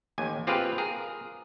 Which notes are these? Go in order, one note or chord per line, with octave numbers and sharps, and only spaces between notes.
A1 D#2 G#5
C4 F4 G4 G#4 B4 F5
G#4 A#4